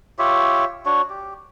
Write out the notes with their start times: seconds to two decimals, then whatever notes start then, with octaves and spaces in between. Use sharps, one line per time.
0.19 F4 G4 C#5 E5
0.86 D4 F#4 C#5
1.10 G4